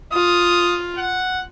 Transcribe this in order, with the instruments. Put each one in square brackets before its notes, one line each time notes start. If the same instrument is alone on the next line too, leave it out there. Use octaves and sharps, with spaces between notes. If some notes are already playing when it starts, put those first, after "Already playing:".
[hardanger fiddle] F4 [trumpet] D#6
[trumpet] F#5